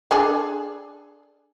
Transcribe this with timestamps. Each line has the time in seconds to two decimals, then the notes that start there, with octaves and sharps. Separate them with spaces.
0.11 D4 G#4 A4